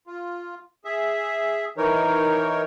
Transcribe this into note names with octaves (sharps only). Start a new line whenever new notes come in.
F4
G#4 E5
E3 D#4 A#4 C#5